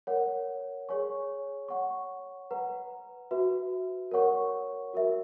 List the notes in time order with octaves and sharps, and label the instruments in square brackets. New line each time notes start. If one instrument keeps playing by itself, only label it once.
[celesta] A#4 C#5 F#5
G#4 C#5 G#5 C#6
C#5 F#5 C#6
B4 F#5 A#5
F#4 B4 E5
A#4 C#5 F#5 C#6
F#4 A#4 E5